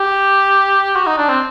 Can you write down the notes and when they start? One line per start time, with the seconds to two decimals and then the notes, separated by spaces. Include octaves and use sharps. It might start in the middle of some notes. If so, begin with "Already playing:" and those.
Already playing: G4
0.96 F#4
1.06 D#4
1.17 D4
1.29 C4